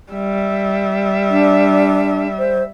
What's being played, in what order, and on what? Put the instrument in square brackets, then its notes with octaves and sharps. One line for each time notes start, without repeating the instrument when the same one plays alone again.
[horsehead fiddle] G3 E5
[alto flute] D4
C5